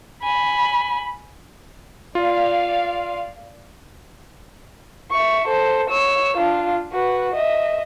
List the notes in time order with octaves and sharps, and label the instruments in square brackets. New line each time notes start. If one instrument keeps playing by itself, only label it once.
[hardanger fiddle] G#5 [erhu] B5
[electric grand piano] F4 [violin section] D5 F5
[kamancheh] E5 C#6
A4 C5
C#5 E6
D4 F4
F#4 B4
D#5 E5